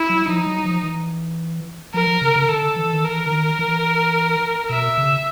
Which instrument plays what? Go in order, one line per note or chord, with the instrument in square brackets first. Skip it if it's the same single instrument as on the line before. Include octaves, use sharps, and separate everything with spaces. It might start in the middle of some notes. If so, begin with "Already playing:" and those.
Already playing: [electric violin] E4
[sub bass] F#3
[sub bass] F3 [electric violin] D#4
[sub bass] F#3
F3
E3
[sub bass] F3 [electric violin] A#4
[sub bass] F3
C#3
C#3
[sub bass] D3 [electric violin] A4
[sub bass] E3
D#3
[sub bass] E3 [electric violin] A#4
[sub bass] D3
D#3
E3
[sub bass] B2 [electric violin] E5
[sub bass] C#3